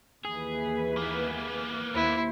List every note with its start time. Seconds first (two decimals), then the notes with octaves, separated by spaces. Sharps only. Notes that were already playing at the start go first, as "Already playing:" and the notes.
0.25 D#2 E3 G#4 B4
0.97 A#3 B3
1.94 D#2 E4 C5